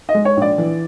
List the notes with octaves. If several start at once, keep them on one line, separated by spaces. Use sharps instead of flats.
D#5
G#3
C#5
A#1
D5
E3